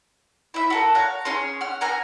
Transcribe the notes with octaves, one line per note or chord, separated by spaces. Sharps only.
E4 E5
F#4 A4 A#4
C#5 F5 F#5 A#5
C#4 G#4 C#5 C6
F#5 F6
F#5 G#5 A#5 F6